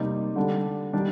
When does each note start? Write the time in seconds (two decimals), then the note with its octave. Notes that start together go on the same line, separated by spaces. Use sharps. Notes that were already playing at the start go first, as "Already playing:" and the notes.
Already playing: C3 G3 A#3 D#4
0.36 D3 G3 D4
0.93 D#3 G3 D4